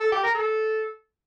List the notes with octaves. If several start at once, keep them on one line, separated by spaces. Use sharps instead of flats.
A4
G4
A#4
A4